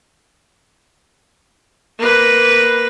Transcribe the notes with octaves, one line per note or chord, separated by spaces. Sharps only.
A#3 B4